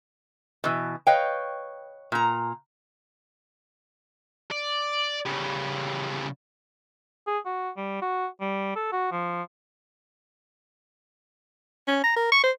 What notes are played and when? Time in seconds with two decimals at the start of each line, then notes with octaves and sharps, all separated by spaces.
0.64 B2 E3
1.07 B4 C#5 D#5 F5 G5
2.12 A#2 A#5
4.51 D5
5.26 C#3 G3
7.27 G#4
7.45 F#4
7.77 G3
8.01 F#4
8.41 G3
8.76 A4
8.92 F#4
9.12 F3
11.88 C#4
12.04 A#5
12.16 A#4
12.32 C#6
12.43 C5